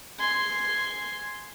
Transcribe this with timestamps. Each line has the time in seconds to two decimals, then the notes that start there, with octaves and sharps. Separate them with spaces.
0.19 G#5 C6